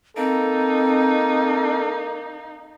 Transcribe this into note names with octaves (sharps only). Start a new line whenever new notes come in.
A#3 C4 D#4 A4